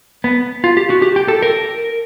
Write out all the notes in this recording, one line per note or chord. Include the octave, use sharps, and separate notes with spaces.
B3
F4
G4
F#4
G4
G4
A4
A#4